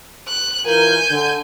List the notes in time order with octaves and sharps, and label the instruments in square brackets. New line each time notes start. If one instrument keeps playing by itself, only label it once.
[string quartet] F#6
[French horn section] E3 F4 A#4 [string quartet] G#5 G6
[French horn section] D3